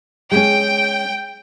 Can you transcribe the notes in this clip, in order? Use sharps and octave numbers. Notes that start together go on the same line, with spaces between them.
G#3 C#4 G5